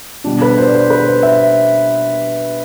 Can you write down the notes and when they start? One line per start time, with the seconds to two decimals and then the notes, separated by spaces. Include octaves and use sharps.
0.24 B2 G3 D4
0.42 B4
0.58 C5
0.66 D5
0.75 C5
0.90 B4
1.07 C5
1.23 E5